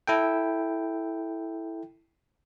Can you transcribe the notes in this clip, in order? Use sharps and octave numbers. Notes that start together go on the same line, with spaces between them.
E4 A4 G5